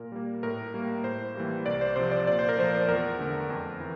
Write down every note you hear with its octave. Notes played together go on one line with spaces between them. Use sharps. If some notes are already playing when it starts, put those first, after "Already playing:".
Already playing: A#2 A#4
G3 A#3
A2 A#4
G3 A#3
A2 C5
E3 G3 A#3
C2 D5
C5
C3 F3 C5
D5
A#2 D5
C5
A#4
F3 A3 C5
E2 A#4
D3 A3
F2
E3